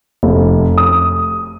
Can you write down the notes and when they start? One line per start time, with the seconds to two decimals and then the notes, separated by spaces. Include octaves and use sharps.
0.23 F1
0.78 D#6